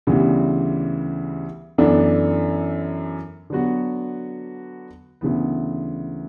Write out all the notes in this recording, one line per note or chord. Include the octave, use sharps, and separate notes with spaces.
D2 C#3 E3 G3 B3
F#2 E3 B3 D4 A4
D3 F#3 B3 F#4
D2 C#3 E3 B3